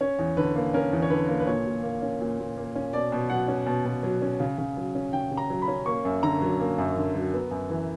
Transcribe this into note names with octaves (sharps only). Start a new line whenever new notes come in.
C#4 C#5
E2
D3 B4
A#3
C#4 A#4
E2
C#5
D3 B4
A#3
B4
A#2 C#5
A#2
A#3
C#4
A#2
A#2
A#3
C#4
B2 D5
B2
F#3 F#5
C#4
B2
B2
F#3
C#4
C#3
C#3
F#3
C#4
C#3 G5
C#3
A#5
F#3
B5
C#4
A#3 C#6
F#2
D3 A#5
F#3
A#3
F#2
D3
F#3
B3
F#2
E3